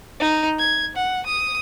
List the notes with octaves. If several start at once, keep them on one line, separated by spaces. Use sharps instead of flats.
D#4
G#6
F#5
D#6